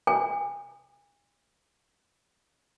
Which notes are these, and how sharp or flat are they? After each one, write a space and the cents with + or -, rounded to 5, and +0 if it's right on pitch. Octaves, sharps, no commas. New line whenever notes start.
G#5 -35